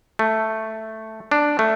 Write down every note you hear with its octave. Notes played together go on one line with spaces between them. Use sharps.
A3
D4
A3